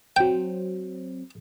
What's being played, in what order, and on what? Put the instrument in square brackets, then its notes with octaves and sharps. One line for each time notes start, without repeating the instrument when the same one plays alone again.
[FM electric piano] F#3 C4 [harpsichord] G5